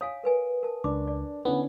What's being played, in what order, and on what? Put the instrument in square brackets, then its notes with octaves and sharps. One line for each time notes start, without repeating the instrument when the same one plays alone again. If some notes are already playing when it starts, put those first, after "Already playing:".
[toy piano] C#5 F5 G#5 [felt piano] D#6
[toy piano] A#4 B4 G#5
A#4 A5
[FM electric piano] C#2 [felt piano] D4 [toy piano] D6
[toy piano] D5
[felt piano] D3 C#4 E4 [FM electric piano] B3